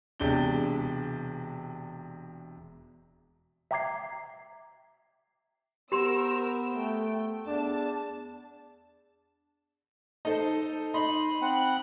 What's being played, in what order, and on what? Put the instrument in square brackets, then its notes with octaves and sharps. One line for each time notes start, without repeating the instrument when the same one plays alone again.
[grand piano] E1 C3 G#3 D4 G7
[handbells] E5 G5 A#5 D6 G#6 C7
[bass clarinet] B3 [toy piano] G4 C6 [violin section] A#4 E6 [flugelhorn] C5
[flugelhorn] A3 [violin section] G5
[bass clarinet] E2 [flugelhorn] D4 [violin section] A5
[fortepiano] D#4 A4 C5
[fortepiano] D#4 [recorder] B5 [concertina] C6
[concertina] C4 F#5